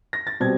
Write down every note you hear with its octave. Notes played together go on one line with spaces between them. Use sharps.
A#6
A6
B2 G3 C4 G#6